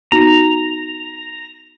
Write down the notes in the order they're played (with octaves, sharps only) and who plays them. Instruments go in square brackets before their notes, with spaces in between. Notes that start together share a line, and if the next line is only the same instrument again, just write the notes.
[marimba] B3 D#4 F#4 [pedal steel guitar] A#5